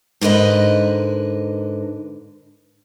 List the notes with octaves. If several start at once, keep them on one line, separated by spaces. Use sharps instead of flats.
G#2 D3 A#4 B4 D#5